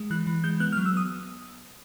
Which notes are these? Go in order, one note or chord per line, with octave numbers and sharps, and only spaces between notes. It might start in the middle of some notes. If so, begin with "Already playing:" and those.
Already playing: G#3
E3 F#6
E3
G#3 G6
B3 F#6
F6
F#3
E6
B3 D#6